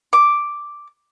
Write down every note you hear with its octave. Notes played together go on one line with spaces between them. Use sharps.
D6